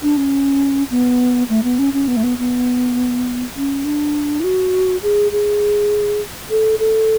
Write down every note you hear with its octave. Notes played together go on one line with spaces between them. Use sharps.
D4
C#4
B3
A3
B3
C#4
C#4
B3
A3
B3
B3
C#4
D4
E4
F#4
G#4
G#4
A4
A4